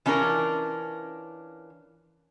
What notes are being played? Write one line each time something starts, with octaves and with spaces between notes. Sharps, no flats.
E3 C#4 D4 F4 A#4